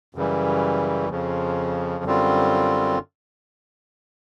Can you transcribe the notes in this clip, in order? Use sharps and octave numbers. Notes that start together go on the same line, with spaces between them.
F#2 C#3 E3 G3
F2 C#3 F3
F#2 D3 G3 C4 F4